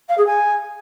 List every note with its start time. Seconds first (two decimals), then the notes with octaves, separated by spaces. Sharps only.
0.08 F5
0.17 G#4
0.26 G#5